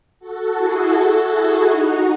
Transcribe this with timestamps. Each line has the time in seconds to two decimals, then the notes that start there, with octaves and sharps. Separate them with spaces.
0.19 F#4 A4
0.54 E4 G#4
0.88 F#4 A4
1.23 E4 G#4
1.58 D#4 F#4